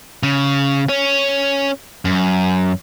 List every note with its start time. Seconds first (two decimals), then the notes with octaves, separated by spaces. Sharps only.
0.23 C#3
0.89 C#4
2.05 F#2